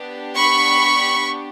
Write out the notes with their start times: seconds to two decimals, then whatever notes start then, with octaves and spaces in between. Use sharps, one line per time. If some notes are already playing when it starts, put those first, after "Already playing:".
Already playing: B3 D4 G4
0.36 B5 C#6